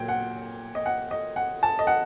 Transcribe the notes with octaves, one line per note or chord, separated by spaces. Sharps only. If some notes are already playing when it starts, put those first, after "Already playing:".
Already playing: A#2 F#3 G5
F#5
D#5
F#5
D#5
F#5
A5
D#5
F#5